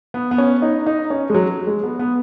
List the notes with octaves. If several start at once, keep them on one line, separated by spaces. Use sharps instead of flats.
B3
B3
C#4
D#4
D#4
C#4
G#3
F#3
G#3
B3
B3